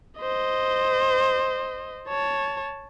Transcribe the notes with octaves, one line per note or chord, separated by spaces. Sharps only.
C5 D#5
C#5 A5